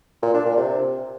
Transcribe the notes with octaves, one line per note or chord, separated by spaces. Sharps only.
A#2
D4
A#2
C3